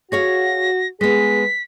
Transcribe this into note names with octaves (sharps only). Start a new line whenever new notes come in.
F#4 G#4 C#5 F5 A#6
G#3 B3 G#4 B6